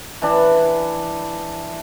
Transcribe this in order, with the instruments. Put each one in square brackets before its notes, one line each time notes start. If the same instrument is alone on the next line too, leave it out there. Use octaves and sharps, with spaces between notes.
[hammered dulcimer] E3 D4